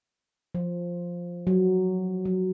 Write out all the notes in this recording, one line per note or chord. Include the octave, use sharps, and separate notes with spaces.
F3
F#3
F#3